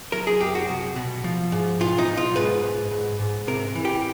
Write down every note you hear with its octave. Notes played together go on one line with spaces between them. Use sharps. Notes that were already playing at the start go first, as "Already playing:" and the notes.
F#3 A#4
G#4
F#2 G4
F#4
C2
B2
F3
G#2
B1 F4
D#4
B1
F4
G#2 B4
G#2
G#2
G#2
C3 A#4
E3
G4